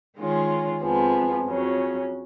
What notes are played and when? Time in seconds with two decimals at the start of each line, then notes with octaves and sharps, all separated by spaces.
0.17 D#3 G#3 C#4 F4
0.82 F2 F3 G#3 B3
1.46 F2 C#3 F#3 C#4